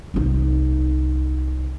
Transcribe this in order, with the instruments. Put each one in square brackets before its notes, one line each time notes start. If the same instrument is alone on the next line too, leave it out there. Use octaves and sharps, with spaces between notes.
[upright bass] C2 D#4